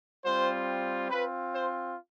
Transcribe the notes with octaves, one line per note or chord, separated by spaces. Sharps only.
G3 C4 F4 C5
C4 F4 B4
C5